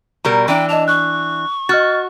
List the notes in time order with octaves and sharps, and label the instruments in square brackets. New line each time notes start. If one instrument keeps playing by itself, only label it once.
[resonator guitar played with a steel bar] B2 G3 A#4 [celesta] A#5
[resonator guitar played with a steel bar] E3 D4 [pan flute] G5
[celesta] D#5 F7 [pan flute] A5
[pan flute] C#6 [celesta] F#6
[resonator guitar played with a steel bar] F#4 [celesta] D#5 F6 A6